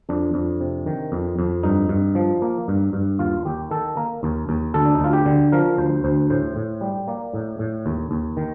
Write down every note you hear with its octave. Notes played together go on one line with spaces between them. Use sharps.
F2 D4
F2
C3
D#3
F2
F2
G2 D#4
G2
F3
A#3
G2
G2
D#2 F4
D#2 G4
D#3 A4
A#3 A#4
D#2
D#2
D2 A4
D4
D#4
D2 F4
G4
D3
F3 A#4
D2 C5
D2 C5
A2 C5
A2
G3
A#3 D5
A2
A2
D#2
D#2
D#3